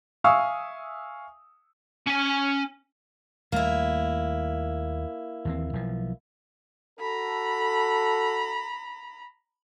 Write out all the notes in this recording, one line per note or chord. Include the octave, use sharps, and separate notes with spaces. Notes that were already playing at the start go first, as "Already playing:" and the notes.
E5 F5 G#5 C#6 D#6 E6
C#4 G#5
D#2 G3 A3 A#3 E4
D#2 E3 C4
B1 F3
F#4 A4 A#5 B5